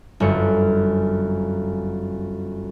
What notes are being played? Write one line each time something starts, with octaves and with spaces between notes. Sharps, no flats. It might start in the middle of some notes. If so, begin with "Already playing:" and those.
G1 F#2 C#4 C#7